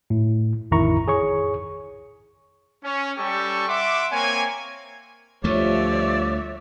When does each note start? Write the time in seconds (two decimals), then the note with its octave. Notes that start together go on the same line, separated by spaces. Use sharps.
0.10 A2
0.71 A1 F2 D#3 E4 A#5 C#6
1.08 G#4 C#5 C#6
2.83 C#4
3.17 G3 C#4 G4 A4 C#6
3.68 E5 F#5 C6 D6
4.11 A#3 C4 C#5 G#5
5.44 D2 F3 G3 A3 F4 C#5 D5 E5